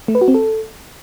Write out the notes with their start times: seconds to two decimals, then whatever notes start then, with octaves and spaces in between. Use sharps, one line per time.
0.08 A3
0.15 B4
0.21 F#4
0.28 C4
0.34 A4